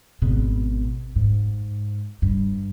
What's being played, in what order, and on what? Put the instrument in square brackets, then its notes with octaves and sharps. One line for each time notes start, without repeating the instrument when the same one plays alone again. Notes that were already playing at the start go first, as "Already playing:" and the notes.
[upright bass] G#1 B2
G#2
G2